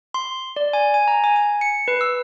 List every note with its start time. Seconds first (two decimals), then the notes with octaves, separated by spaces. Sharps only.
0.14 C6
0.56 D5
0.73 G#5
0.94 G#5
1.08 A#5
1.24 G#5
1.36 G#5
1.61 C#7
1.88 B4
2.01 E6